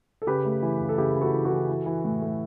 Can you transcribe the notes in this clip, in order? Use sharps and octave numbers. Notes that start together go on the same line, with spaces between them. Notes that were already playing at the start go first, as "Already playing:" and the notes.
A4
C#3 G4 B4
A3
E3
C#3
A4
C#3 E4 G4
C#3
F#4 A4
E3
F#4 A4
E3
E3
E3
A2
A3